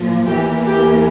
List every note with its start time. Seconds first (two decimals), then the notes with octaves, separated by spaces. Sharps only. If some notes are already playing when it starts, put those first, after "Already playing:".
Already playing: A#2 F3
0.26 E2 E3 A#3 G4
0.66 G4